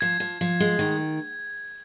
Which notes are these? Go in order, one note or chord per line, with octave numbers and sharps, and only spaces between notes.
F3 G#6
F3
F3
G#3
D#3